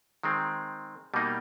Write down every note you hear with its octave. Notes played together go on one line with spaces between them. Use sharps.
D#3 G#3 C4
B2 G3 A#3 D#4